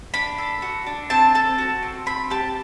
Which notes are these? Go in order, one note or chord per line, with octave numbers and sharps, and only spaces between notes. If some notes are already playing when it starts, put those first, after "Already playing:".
D4 B5
A4
F#4
D4
C4 A5
A4 A5
F#4
C4
C4 B5
G4 A5